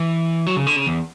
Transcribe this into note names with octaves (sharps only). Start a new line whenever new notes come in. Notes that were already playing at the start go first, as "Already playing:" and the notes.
Already playing: E3
F#3
C#3
D3
C#3
E2